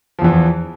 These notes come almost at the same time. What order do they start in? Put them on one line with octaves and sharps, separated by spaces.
F3 E2 E3